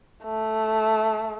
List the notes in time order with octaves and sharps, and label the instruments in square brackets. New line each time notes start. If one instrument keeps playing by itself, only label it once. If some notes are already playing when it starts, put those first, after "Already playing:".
[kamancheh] A3